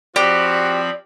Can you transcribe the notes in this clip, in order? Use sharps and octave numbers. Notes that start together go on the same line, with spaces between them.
F3 C4 F#4 G4 D5 B5